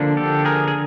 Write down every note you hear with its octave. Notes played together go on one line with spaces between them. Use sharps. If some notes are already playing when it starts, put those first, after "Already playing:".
Already playing: D3 F3 A#3 D4
G4 A4
G#4 A#4
G#4